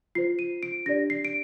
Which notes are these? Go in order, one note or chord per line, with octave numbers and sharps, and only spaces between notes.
F4 C5 C7
D#7
D7
D4 G4 D5 A#6
C7
D7